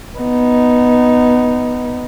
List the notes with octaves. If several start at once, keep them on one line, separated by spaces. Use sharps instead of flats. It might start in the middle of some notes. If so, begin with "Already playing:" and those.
B3 D#4